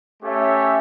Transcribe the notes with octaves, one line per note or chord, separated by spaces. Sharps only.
A3 C#4 G4 C#5 E5